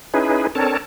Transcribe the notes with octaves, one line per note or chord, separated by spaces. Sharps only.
C#4 D#4 E4 G#4 B4
C4 D4 A4 A#4 C#5 A5